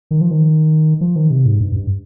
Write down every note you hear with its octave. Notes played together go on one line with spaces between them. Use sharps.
D#3
F3
D#3
F3
D#3
C3
G#2
G2
G2